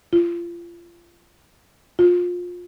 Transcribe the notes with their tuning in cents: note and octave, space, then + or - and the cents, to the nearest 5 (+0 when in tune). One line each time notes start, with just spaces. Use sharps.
F4 -30
F4 +25